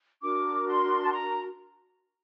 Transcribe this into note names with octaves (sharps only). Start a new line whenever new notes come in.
D4 F#4 A#4 D6
C6
A5
A#5